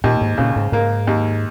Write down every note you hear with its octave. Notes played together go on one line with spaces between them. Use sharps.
D#2 A#2
G#2
A#2 C#3
G#2
G#2 A#3
D#2